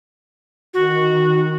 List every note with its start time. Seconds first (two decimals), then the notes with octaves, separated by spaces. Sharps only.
0.74 D#3 F#4